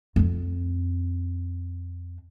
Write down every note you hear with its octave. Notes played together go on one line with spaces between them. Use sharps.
F2 C4